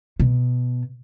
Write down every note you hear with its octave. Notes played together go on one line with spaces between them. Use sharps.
B2